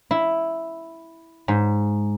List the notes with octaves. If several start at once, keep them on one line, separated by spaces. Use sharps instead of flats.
E4
G#2